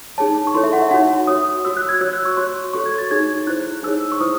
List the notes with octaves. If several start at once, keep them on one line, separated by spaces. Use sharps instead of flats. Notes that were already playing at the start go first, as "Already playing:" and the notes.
D#4 G#4 C#5 A5
C#6
E4 A4 C#5 C6
E5
F#5
E5
D#4 F#4 C#5 F#5
F#4 C#5 D#6
F#4 C#5 E6
F#6
G#6
F#4 C#5 E6
F#6
C#6
F#4 C#5 C6
F#4 A4 C#5 C#6
G#6
A6
D#4 G#4 C#5 G#6
E4 C5 F#6
D#4 G#4 C#5 E6
C#6
E4 C5 D#6